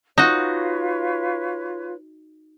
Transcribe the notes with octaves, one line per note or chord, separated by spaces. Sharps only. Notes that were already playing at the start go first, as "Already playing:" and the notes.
D#4 F4 F#4 B4 C#5